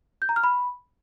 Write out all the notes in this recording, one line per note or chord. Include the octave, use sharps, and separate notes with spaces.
G6
A#5
F6
B5